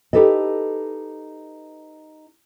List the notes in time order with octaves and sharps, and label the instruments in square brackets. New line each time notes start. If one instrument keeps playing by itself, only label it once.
[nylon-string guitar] D#4 G4 A4 B4 D#5